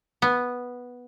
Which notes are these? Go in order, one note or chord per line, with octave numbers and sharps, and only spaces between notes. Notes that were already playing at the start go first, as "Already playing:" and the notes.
B3